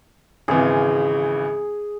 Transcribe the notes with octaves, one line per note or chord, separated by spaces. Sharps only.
G#1 C#3 E3 G#4